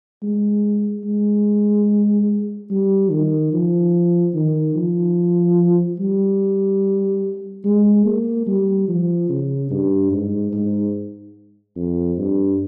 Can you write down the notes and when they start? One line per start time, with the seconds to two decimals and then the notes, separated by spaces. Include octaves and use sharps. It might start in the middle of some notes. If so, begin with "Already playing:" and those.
0.23 G#3
1.05 G#3
2.71 G3
3.11 D#3
3.53 F3
4.35 D#3
4.76 F3
5.99 G3
7.64 G#3
8.06 A#3
8.47 G3
8.88 F3
9.29 C#3
9.71 G2
10.12 G#2
10.53 G#2
11.76 F2
12.18 G2